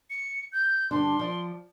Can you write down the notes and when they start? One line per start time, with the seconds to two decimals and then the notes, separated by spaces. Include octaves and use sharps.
0.10 C#7
0.52 G6
0.91 G2 D3 D4 C6
1.19 F3 D5